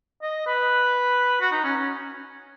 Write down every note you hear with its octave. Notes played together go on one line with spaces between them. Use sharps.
D#5
B4
F#4
D#4
C#4
C#4